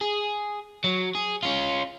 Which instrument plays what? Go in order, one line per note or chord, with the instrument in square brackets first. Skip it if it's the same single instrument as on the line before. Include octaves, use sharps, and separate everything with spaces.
[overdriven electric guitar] G#4
F#3
G#4
C#4 F4